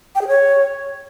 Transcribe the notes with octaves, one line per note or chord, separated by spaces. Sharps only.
G5
G#4
C#5